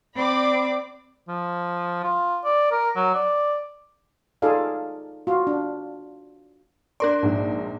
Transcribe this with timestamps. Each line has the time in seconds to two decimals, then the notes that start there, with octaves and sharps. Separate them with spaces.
0.16 C4 D5 B5 D6
1.28 F3
2.04 F4
2.44 D5
2.72 A#4
2.96 F#3
3.15 D5
4.42 D#4 F4 G#4 A4 D5 F5
5.27 F4 F#4
5.47 D4
7.00 D4 A#4 D5 C6 F#6
7.22 A#1 G#2